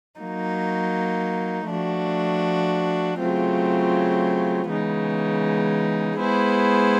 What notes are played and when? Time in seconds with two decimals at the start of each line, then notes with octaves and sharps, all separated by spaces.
0.20 F#3 A#3 D#4
1.70 F3 A3 D4 F#4
3.19 C#3 F#3 A3 C4 F4
4.69 C#3 E3 G#3 B3 D#4
6.18 G#3 B3 E4 G#4 C5